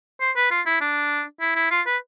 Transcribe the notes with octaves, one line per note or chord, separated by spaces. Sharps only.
C5
B4
F4
E4
D4
E4
E4
F4
B4